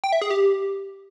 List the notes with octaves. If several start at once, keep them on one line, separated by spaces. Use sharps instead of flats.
G5
E5
G#4
G4